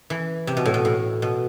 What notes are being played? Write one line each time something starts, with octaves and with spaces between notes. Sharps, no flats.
E3
C3
B2
A2
B2
A2
B2